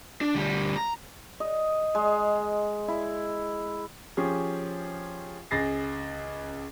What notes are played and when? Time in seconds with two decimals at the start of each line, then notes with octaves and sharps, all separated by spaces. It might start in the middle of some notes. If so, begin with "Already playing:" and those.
0.21 D4
0.35 D2 G3
0.76 A#5
1.40 D#5
1.95 G#3
2.88 E4
4.17 F3 C#4 G4 G#4
5.51 C#2 G#4 A6 A#6 C7